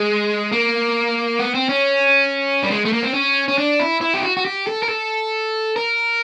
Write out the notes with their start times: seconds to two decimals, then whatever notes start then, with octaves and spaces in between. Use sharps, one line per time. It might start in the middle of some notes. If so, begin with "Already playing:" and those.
Already playing: G#3
0.52 A#3
1.39 B3
1.54 C4
1.69 C#4
2.63 G3
2.71 G#3
2.85 A3
2.93 A#3
3.02 C4
3.13 C#4
3.48 C#4
3.58 D4
3.80 E4
4.01 E4
4.14 G4
4.23 F#4
4.37 F#4
4.45 G4
4.67 A4
4.83 A#4
4.89 A4
5.76 A#4